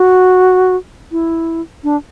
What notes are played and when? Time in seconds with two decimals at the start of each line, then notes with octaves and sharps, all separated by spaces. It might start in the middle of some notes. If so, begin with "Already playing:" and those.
Already playing: F#4
1.12 E4
1.84 D4